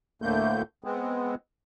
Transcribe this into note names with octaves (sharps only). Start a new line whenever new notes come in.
D2 A2 D3 A3 A#3 G6
G#3 B3 C4